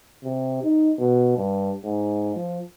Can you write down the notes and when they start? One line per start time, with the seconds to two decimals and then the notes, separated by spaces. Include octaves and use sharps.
0.24 C3
0.63 D#4
0.99 B2
1.37 G2
1.84 G#2
2.36 F3